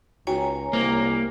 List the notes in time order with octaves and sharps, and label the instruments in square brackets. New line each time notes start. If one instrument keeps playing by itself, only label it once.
[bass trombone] C#2 [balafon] D#4 F#4 G5 [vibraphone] C#5 G#5 A#5
[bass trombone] C2 [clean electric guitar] A#3 [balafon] C5